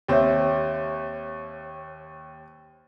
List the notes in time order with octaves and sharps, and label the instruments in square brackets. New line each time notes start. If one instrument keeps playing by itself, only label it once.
[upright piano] D#2 C4 [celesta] G4 C#5 E5